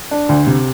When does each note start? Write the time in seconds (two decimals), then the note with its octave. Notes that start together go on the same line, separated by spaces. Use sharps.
0.11 D4
0.29 D2
0.47 C3